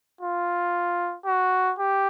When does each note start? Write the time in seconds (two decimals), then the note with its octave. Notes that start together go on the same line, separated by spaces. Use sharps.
0.21 F4
1.26 F#4
1.79 G4